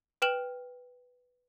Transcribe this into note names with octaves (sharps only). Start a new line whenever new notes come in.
B4 G5 F6 E7 F#7